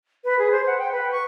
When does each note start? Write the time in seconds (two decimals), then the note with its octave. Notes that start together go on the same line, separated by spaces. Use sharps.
0.24 B4
0.39 G#4
0.52 C5
0.67 F#5
0.79 G5
0.92 B4
1.12 C#6